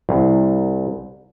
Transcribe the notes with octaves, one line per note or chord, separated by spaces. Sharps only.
C2